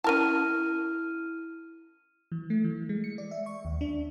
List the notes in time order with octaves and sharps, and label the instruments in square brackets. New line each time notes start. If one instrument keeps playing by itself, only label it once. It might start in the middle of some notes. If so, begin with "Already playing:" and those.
[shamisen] C#4 A#4 A5 [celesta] E4 F6 D#7
[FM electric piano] E3
A3
E3
G#3
C#7
D5
E5
C#6
D#2
D4